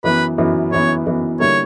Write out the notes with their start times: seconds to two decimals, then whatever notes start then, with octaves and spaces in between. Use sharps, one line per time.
0.04 F#2 E3 B3 B4
0.38 F#2 E3 B3
0.72 F#2 E3 B3 C#5
1.07 F#2 E3 B3
1.40 D3 G3 A#3 E4 A#4 C#5